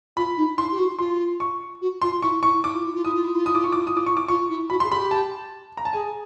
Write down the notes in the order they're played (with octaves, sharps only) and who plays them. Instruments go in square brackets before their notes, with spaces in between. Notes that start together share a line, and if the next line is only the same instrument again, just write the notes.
[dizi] F4 [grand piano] B5
[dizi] D#4
[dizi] E4 [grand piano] C6
[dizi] G4
F#4
[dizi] F4 [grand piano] C6
[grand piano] C#6
[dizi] F#4
[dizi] F4 [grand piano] C6
[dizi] E4 [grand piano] C#6
[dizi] E4 [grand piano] C#6
[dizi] E4 [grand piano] D6
[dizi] F4
E4
F4
[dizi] E4 [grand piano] D#6
[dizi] F4
E4
F4
[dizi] E4 [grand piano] D#6
[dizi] F4 [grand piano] D6
[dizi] E4 [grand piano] C#6
[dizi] F4 [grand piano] D6
[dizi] E4 [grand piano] D#6
[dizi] F4 [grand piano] D6
[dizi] E4 [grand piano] C#6
[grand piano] D6
[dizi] F4 [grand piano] C#6
[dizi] E4
[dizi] F#4 [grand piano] B5
[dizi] G#4 [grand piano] C6
[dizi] G4 [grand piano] B5
[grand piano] A5
A#5
A5
[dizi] G#4 [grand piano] G#5